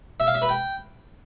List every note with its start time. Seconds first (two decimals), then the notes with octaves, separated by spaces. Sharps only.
0.20 E5
0.27 F5
0.34 E5
0.42 B4
0.49 G5